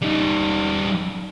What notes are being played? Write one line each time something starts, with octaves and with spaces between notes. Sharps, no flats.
G3 D#4